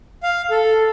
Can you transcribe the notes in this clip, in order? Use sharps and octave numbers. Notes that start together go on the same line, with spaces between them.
F5
A4